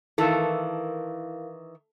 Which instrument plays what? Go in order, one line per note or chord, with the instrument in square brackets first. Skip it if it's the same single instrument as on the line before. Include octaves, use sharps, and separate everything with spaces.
[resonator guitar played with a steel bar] D#3 E3 [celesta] E4 A#4 F5 [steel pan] A4